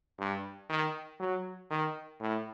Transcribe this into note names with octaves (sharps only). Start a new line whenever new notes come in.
G2
D#3
F#3
D#3
A2